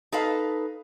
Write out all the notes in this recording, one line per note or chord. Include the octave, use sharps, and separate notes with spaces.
D#4 A4 B4 F5